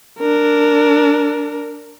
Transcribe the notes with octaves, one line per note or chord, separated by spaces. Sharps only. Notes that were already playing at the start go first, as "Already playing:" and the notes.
D4 A#4